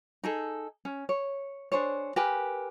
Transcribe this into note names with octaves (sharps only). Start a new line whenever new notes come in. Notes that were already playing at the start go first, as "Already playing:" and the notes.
D#4 G#4 A4
C#4
C#5
D4 G#4 C5 C#5
G4 A#4 B4 G#5